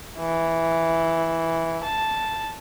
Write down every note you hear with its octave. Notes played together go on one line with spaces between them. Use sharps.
E3
A5